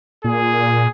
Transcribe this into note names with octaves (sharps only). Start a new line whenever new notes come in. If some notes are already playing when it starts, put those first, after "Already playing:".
A#2 G#4